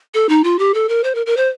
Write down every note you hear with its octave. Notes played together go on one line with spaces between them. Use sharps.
A4
D#4
F4
G4
A4
A#4
C5
A#4
A#4
C5